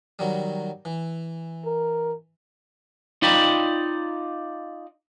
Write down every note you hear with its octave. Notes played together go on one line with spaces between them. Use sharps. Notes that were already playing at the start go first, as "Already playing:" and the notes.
D#3 F#3 G3
E3
A#4
D#4 F4 D5 G5 B5